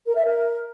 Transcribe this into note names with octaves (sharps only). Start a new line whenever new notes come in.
A#4
E5
A#4